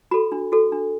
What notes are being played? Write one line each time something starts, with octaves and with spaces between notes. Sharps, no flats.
F#4 A4 B5
D4
F#4 A4
D4